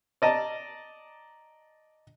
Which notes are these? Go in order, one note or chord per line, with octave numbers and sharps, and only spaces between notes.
D5 D#5 A5 A#5